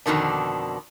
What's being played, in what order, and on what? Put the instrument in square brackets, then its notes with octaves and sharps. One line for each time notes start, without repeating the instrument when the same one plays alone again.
[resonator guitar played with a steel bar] F2 B2 D3 D#3 D4